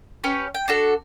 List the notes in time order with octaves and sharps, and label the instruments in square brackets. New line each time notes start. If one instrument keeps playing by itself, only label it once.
[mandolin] C#4 G4 B4 C#5
G5
D4 F#4 A4